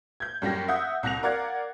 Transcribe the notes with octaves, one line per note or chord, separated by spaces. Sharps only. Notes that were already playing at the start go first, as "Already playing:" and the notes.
G6 G#6
F#2 G3 G4 A#6
E5 F#5 D#6 G6
C2 F#6 A#6 F7
A#4 D5 F5 F#5 G#6